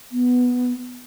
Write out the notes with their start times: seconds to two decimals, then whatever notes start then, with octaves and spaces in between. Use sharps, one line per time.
0.12 B3